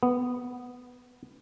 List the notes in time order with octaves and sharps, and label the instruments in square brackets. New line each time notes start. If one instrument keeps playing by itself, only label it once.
[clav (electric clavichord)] B3